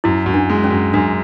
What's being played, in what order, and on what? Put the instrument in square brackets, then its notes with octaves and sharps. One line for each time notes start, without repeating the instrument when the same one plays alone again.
[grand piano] F#2 [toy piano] E4
[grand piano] F#2
[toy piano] D4
[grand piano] G#3
[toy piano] C#4
[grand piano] F#2
[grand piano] F#2 [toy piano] D4